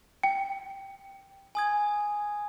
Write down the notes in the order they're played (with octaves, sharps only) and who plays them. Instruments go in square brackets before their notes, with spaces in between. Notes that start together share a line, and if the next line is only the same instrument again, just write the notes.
[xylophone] G5
[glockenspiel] G#5 D#6 G#6